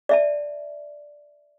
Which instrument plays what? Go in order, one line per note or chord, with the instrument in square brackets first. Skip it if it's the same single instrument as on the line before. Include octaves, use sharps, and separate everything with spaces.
[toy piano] D5 E5 A5